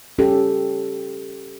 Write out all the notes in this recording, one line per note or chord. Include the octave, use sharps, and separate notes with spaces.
C#4 G4 A4